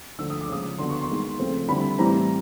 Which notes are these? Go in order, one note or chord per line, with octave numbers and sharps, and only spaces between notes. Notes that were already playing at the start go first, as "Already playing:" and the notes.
D3 F3 A3 E6
D#6
D6
C#3 F3 G#3 D#6
D3 F#3 B3 C6
C#6
C6
D#3 G#3 B3
C#3 F3 A3 C4
D3 G3 C4 E4 B5
A2 E3 G3 C4 A#5